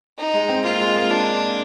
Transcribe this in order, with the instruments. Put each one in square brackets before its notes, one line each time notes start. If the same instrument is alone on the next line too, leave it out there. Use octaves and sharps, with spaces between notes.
[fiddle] D#4
[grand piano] G#3
C4
[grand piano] A#3 [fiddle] F4
[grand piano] G#3
A#3
[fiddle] D4